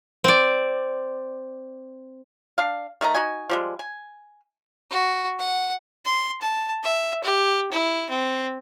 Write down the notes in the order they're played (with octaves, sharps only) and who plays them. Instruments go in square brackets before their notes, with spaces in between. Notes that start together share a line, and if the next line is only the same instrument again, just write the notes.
[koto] C4 D5
[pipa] D4 F5
D#3 A3 D#5 A#5
D#4 F#4 D#5 G#5
F3 G3 G#3
G#5
[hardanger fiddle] F#4
F#5
[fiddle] C6
A5
E5
G4
E4
C4